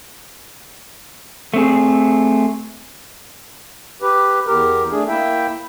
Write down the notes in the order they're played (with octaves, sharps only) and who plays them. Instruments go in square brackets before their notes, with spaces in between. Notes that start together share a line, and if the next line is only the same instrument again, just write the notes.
[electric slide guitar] A3 C4 G#4
[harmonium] G4 B4
E2 G4 A#4
A3 D4 G#4
A#3 E4 E5 G5